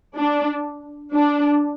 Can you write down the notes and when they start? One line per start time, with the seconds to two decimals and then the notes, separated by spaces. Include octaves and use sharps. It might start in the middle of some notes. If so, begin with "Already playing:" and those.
0.16 D4
1.13 D4